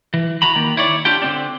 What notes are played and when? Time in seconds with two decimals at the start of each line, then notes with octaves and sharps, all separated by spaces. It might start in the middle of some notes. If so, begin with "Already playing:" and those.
0.14 E3
0.42 E3 F#4 A#5 B5
0.55 D#3 A#3
0.77 E4 C#5 D5
1.05 D4 F4 G4 G5
1.22 D3 C4 D4